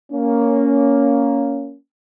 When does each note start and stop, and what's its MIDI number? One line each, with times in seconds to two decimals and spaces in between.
0.13 1.76 58
0.13 1.76 61